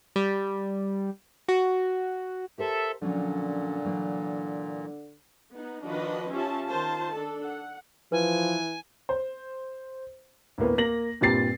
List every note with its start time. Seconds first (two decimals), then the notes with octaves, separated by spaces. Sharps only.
0.16 G3
1.48 F#4
2.58 G4 A4 A#4 C5 E5
3.02 A#2 D3 F3 F#3 C#4
3.84 E3 F#3 A#3
5.53 B3 D#4
5.84 D#3 F3 D4 F#4 B4 D#5
6.31 C#4 F4 G4 E5 A5
6.68 D#3 F4 C5 A5
7.14 D4 A4
7.44 F#5
8.12 E3 F3 B4 G#5
9.09 C5
10.58 D2 A2 A#3 B3
10.78 A#3 A#6 F#7
11.21 G2 A#2 G3 C4 A6 C7